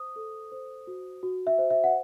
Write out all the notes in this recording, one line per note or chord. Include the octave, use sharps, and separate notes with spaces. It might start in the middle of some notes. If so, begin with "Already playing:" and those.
Already playing: C5 D#6
A4
C5
F#4
F#4
E5
C5
E5
F#5